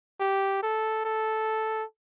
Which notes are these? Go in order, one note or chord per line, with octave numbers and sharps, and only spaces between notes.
G4
A4
A4